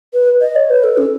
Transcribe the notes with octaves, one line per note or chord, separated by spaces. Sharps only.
B4
D#5
C#5
B4
A4
C#4